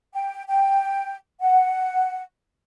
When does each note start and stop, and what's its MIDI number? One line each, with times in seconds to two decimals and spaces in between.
0.13 0.43 79
0.49 1.15 79
1.41 2.21 78